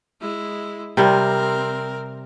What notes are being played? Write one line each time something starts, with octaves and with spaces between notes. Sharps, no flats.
G#3 E4
C3 G3 C4 A#4